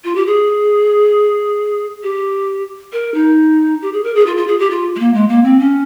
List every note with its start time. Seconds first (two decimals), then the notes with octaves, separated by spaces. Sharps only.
0.04 F4
0.15 G4
0.26 G#4
2.03 G4
2.93 A#4
3.14 D#4
3.82 G4
3.93 G#4
4.04 A#4
4.15 G#4
4.26 F4
4.37 F4
4.47 G#4
4.59 G4
4.71 F4
4.96 G#3
4.99 A#3
5.14 G#3
5.29 A#3
5.44 C4
5.59 C#4